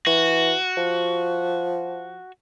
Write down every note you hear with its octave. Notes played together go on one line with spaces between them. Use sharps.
E3 F#4
F3